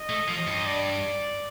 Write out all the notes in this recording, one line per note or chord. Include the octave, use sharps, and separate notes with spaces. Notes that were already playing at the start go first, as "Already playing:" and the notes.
Already playing: D#5
A3
F3
G2
D5